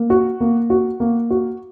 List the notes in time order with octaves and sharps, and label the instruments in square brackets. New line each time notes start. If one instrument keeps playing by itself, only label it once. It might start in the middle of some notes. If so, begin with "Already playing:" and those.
Already playing: [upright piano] A#3
F#4
A#3
F#4
A#3
F#4